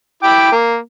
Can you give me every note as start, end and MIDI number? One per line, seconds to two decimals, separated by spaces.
0.23 0.51 64
0.23 0.51 79
0.23 0.51 86
0.52 0.78 58